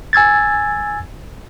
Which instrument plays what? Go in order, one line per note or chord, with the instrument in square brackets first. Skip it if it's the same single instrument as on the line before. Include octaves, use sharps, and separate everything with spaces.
[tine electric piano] G#5 E6 G#6 A6